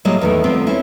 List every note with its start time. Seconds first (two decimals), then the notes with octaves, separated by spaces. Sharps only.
0.05 A2 F#3 G#3 A#3 G4 D#5
0.21 E2 D#3 A3
0.44 F3 B3 C4
0.67 C4 C#4 E4